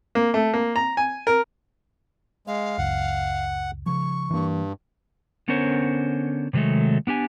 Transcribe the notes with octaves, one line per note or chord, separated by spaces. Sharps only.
A#3
A3
A#3
A#5
G#5
A#4
G#3 F5
F#1 C#2 F#5
C#3 F3 C#6
G2 E3 A#3
D3 B3 C#4 A#4 C5 C#5
C3 D#3 F#3 G#3 A3
B3 D4 G4 G#5